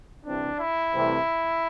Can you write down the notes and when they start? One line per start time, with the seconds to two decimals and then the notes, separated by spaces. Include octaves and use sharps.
0.25 C2 C3 E3 C4 D4
0.59 E4
0.93 C2 C3 E3 A3 C4